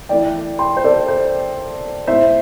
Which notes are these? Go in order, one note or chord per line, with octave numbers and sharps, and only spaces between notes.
E3 A3 E4 D5 G5
G5 C6
C5
A4 D5
C5
A2 A3 E4 C5 E5